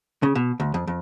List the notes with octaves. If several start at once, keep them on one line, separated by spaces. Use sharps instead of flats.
C#3
B2
D2
F2
F2